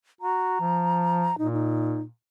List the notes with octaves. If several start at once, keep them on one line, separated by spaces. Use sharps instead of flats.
F#4 A#5
F3
A#2 D#4
D#4